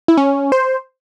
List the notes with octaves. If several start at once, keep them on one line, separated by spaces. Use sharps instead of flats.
E4
C#4
C5